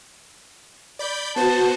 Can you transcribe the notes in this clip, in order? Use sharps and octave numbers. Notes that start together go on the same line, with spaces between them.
D5 B5 G6
B3 F#4 C5 A5